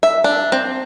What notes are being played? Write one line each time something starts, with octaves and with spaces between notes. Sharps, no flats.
E5
D4
C4